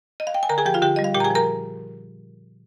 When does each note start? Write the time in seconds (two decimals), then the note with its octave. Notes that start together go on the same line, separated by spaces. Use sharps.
0.20 D#5
0.27 F5
0.34 G5
0.43 G#5
0.49 D3 A#4 A#5
0.58 G#4 G#5
0.65 F3 G4 G5
0.74 F4 F5
0.81 D3 G4 G5
0.96 G3 D#5
1.04 F5
1.14 A#2 G4 G5
1.20 A#5
1.24 G#4 G#5
1.30 F3 A#4 A#5